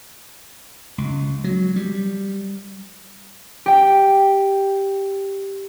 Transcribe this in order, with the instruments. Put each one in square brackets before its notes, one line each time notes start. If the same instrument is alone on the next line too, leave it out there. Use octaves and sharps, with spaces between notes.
[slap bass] C#2
F#3
G3
[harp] G4 G5